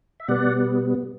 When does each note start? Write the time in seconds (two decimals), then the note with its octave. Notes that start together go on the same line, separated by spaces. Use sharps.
0.20 E5
0.28 B2 G3 B3 D5 F#5